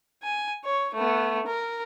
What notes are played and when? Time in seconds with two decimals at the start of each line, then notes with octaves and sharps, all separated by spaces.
0.23 G#5
0.65 C#5
0.94 A3 B3
1.46 A#4